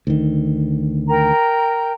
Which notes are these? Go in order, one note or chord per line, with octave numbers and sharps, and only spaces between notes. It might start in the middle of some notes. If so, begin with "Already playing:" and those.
D2 D#3
A#4 G5 A#5